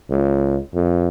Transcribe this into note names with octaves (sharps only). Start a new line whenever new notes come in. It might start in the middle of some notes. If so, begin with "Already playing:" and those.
C#2
F2